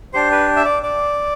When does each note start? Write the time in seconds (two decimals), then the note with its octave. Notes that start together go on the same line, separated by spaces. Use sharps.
0.14 D4 G4 C5
0.32 B4
0.56 E5
0.65 D5
0.83 D5